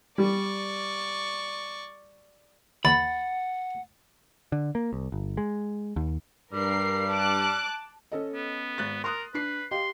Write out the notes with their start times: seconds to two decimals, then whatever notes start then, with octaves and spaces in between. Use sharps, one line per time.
0.18 G3 D5 C#6
2.85 D#2 F#5 B5 A6
4.52 D3
4.75 A#3
4.93 C2
5.12 G1
5.37 G#3
5.96 D#2
6.53 G2 G3 A#4 C7
7.10 A5 D6 F#6
8.12 C#4 A4 D#5
8.34 B3
8.78 G#1 F#6 A6
9.04 A#4 C6 D#6 F#6
9.34 D4 B4 C7
9.71 G4 D#5 F5 C6